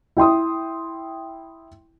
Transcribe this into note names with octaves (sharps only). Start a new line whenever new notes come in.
E4 G5 C6 D#6